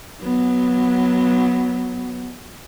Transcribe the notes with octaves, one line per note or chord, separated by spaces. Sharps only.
F#3 B3